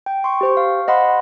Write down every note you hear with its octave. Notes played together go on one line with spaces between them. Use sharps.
G5
C6 C#6
G4 C5 C#6
F5
D#5 F#5 B5 C6